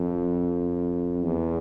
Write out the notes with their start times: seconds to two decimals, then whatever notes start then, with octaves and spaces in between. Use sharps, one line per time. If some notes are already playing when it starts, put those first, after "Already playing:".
Already playing: F2
1.23 E2